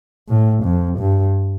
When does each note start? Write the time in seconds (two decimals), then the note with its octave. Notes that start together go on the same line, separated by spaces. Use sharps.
0.29 A2
0.64 F2
0.99 G2